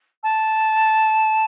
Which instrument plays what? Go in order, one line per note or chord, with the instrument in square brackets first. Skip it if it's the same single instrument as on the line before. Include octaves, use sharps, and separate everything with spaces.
[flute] A5